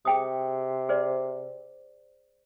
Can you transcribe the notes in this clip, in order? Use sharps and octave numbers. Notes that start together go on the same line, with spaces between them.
C3 G#4 G5 D#6
G#4 C5 D5